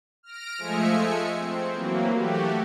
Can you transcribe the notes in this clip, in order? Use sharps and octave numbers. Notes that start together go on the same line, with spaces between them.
F6 A#6 D7
F3 G#3 A3 E5 G#5 C#7
C4
E3 F#3 A#3
A3 F#4 G4